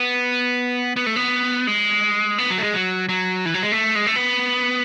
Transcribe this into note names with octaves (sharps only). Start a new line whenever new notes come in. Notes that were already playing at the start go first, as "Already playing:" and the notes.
Already playing: B3
B3
A3
B3
G#3
B3
F#3
A3
G#3
F#3
F#3
E3
F#3
G#3
A3
G#3
A3
B3